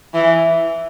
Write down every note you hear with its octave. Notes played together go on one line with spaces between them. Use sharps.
E3